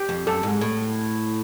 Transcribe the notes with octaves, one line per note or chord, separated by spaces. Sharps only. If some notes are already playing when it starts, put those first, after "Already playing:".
Already playing: G4
F2
F#2 A4
G#2
A2